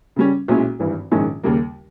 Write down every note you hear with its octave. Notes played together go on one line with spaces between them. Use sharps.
C#3 G3 C#4
B1 A#2 G#3 C#4 E4
G#1 G2 E3
A#1 G#2 D#3 G#3 C#4
D#2 C#3 G3 A#3